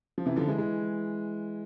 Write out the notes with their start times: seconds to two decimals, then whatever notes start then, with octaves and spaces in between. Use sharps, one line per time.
0.18 F3
0.26 C3 E3
0.36 D3 F3
0.47 E3 G#3
0.58 E3 G#3